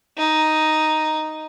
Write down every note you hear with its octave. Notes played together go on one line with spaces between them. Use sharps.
D#4